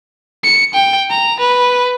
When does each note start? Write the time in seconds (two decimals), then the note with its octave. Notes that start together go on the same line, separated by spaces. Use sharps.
0.44 C#7
0.74 G5
1.10 A#5
1.40 B4